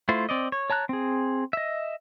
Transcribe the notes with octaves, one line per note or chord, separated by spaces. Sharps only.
A3 E4 F4 C5
C4 D5 D#5
C#5
C#5 A5 A#5 F#6
C4 G#4
D#5 E5